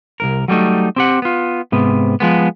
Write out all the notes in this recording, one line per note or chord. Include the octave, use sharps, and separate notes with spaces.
C2 F2 A#4
F#3 G3 A3 D#4
C4 G4 F#5
B3 F4
G#2 C3 B3
F3 G#3 B3